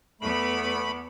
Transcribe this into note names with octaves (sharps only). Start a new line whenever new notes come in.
E2 A3 B3 B5